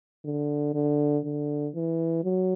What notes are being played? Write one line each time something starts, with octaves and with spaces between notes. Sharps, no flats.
D3
D3
D3
E3
F#3